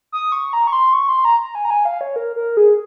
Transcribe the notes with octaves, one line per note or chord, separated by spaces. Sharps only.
D#6
C#6
A#5
C#6
C6
C#6
C6
A#5
A#5
G#5
A#5
G#5
F5
C#5
A#4
A#4
G#4